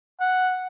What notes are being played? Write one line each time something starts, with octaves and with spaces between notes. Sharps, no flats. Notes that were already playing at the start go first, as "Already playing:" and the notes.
F#5